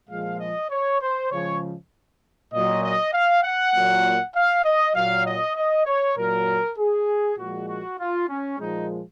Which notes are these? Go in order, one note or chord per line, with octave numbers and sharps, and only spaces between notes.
A#2 F3 G#3 F5
D#5
C#5
C5
C#3 F3 G#3 C#5
A#2 F#3 D#5
D#5
F5
F#5
A#2 F#3
F5
D#5
A#2 F#3 F5
D#5
D#5
C#5
A#2 F#3 A#4
G#4
A#2 F3 G#3 F#4
F#4
F4
C#4
A#2 F3 G#3 D#4